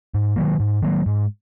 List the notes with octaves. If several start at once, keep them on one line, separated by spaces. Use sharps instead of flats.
G#2
D#3 F#3 A#3
G#2
D#3 F#3 A#3
G#2